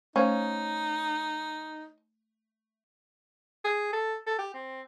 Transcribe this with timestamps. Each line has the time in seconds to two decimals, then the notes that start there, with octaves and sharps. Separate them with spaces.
0.16 A3 C#4 D#4 C5 F5
3.64 G#4
3.93 A4
4.26 A4
4.38 G4
4.54 C4